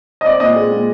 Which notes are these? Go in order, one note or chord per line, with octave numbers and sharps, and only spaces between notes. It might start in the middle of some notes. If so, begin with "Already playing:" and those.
D#5
C4 D5
A#2 D#5
G#3
A#2